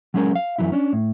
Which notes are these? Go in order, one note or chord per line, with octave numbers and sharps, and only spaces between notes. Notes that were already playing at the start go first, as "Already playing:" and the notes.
F#3 G#3 C#4 G#4 A#4
F5
F#2 E3 F#3 E4
C#4 D4
A2